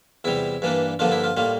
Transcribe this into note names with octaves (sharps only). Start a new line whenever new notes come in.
E2 C3 G3 E4
G2 E3 A#3 D4
G2 D3 F3 A#3 D4 F4
E4
F4
A2 G3 A#3 F4